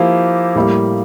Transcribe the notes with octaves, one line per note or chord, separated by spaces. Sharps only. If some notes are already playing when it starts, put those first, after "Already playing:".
Already playing: F3 A#3 E4 G4
A2 G3 A#3